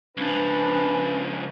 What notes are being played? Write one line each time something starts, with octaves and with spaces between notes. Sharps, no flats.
C#2 F3 C#4 D4 B4